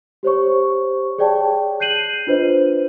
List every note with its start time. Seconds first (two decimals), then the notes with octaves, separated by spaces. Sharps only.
0.23 G4 C5 C#5 C#6
1.18 G#4 C#5 D5 G5 A5
1.80 F#6 G6 C7 D#7 F#7
2.27 D4 F4 B4 C5 D#5